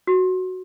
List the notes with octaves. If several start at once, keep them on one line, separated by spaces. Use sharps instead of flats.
F#4